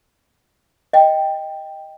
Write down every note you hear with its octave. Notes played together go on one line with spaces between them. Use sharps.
D#5 G5